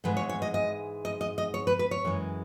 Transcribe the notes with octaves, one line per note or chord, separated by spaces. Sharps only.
G#2 E3 G#3 B4
C#5
C#5
D#5
D#5
D#5
D#5
D#5
C#5
B4
B4
C#5
F#2 E3 G#3